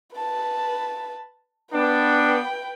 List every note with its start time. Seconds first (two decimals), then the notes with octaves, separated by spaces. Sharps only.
0.17 B4 A5
1.73 B3 D4 B4 G5